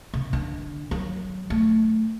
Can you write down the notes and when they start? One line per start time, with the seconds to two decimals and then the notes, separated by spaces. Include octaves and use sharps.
0.14 C#3
0.33 D3
0.91 F#3
1.50 A3